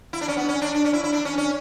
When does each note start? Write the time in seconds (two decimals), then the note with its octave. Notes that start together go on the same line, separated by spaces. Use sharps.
0.13 E4
0.21 D4
0.28 C#4
0.37 B3
0.49 C#4
0.62 D4
0.75 D4
0.85 C#4
0.93 E4
1.04 E4
1.12 D4
1.25 C#4
1.38 C#4